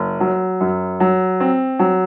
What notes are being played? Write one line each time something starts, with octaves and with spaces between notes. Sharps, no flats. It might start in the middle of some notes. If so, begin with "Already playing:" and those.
Already playing: F#1
F#3
F#2
F#3
C4
F#3